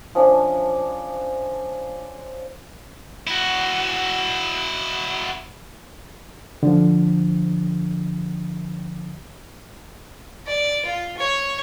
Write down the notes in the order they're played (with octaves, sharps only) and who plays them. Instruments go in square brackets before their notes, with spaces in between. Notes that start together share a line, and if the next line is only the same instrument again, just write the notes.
[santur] F3 C#4 D4 E5
[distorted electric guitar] E4 F#4
[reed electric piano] D3 F3
[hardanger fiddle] D5
F4
C#5